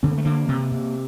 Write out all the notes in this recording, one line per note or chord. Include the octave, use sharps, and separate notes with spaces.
D3 C4
A#3
A3
D3 A#3
C3
C3